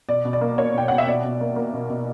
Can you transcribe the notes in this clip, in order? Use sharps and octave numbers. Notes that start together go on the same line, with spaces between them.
B2 D5
B2
D5
A#3
A#3 C#5
B2 G5
B2 F#5
E5
B2 D5
B2
A#3
A#3
B2
B2